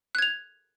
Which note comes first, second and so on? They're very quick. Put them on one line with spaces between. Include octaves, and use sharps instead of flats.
F#6 G#6 F7